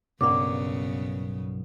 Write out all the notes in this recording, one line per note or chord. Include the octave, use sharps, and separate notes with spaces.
B1 G2 C#3 A#3 B3 D6